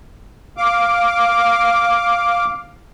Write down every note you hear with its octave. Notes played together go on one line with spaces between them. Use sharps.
F5 D6